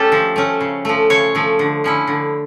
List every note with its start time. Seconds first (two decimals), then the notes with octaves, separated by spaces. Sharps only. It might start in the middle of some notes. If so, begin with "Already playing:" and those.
Already playing: A3 C#4 G4 A4
0.12 F3
0.36 A3 C#4
0.61 C#3
0.85 F3 A3
1.10 C#3 C#5
1.35 F3 A3
1.59 D3
1.84 F3 C#4 E4
2.07 D3